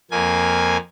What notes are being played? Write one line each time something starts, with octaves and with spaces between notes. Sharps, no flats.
F2 A#3 G#5